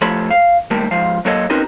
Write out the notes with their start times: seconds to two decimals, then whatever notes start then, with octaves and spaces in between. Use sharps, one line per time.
0.01 F3 A3 A4 C#5 B5
0.31 F5
0.71 G#2 D#3 G3 A3 A#3
0.91 G#2 F3 F5
1.25 F#3 A#3 A4 C#5 D#5
1.50 C4 C#4 D#4 F#4 A#4 B4